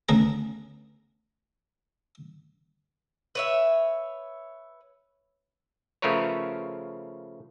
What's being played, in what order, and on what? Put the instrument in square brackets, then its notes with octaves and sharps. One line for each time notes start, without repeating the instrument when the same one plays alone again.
[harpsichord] D2 C#3 B3 G#4 A#5
[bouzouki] B4 C#5 E5
[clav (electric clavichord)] C#3 F3 A3 A#4 B4 C#5